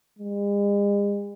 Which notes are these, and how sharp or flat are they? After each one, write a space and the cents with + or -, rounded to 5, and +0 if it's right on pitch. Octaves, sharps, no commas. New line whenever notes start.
G#3 -45